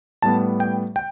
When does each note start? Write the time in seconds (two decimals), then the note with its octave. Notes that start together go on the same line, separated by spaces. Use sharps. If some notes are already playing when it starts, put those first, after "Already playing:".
0.22 A2 G3 B3 A5
0.60 G5
0.96 G5